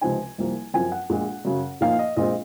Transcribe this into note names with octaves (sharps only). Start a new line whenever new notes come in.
C#2 C3 F3 C4 D#4 G#5
C2 C3 F3 A#3
F#2 F3 C4 F4 G#5
F#5
A#1 A#2 G#3
F#2 C#3 F#3
A#2 F3 A#3 D#4 F5
D#5
A#1 A#2 G#3 C4 F4 D#5